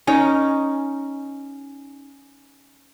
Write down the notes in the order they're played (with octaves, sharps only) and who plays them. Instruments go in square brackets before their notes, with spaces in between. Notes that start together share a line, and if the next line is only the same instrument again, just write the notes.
[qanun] C#4 D#4 A#4 [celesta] G#5